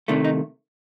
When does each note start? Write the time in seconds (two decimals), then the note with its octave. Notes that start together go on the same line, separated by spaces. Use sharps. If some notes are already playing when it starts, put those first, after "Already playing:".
0.08 C2 C3 D#3 A3 D4
0.25 D#4